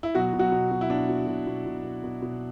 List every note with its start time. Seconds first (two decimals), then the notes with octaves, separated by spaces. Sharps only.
0.03 E4
0.15 B2 F#3 F#4
0.33 B2
0.39 F#3 F#4
0.52 B2
0.71 B2
0.81 E4
0.90 B2 D4
1.09 B2
1.27 B2
1.47 B2
1.66 B2
1.84 B2
2.04 B2
2.22 B2